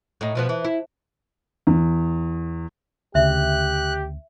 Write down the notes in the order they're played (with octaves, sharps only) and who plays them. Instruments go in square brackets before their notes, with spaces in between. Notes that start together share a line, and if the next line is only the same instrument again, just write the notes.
[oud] A2 D#4
B2 F3 B3
E3
E4
[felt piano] E2
[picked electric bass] D2 C#3 [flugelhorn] G4 [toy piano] E5 [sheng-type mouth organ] F#6